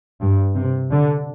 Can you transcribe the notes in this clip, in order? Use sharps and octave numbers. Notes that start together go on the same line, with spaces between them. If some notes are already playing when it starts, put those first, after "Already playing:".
G2
C3
D3